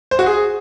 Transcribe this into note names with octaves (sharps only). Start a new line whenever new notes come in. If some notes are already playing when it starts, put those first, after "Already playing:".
C5
F#4
G#4